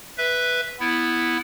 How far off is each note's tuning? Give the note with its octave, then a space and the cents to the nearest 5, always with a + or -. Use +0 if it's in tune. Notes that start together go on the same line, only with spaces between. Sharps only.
B4 +0 E5 -5
B3 +0 E4 +0